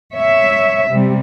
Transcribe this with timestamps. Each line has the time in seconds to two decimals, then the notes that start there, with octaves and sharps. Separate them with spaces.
0.14 C#5 E5
0.90 C3 G3